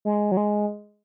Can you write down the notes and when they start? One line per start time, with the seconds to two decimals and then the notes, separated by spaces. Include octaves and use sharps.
0.05 G#3
0.32 F#3
0.37 G#3